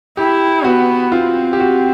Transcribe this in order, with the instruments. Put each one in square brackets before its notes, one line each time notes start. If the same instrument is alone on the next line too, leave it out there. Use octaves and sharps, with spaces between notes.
[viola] E4 [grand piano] G4
[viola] B3 [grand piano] F#4
[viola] C4 [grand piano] F4
[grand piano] G4
F#4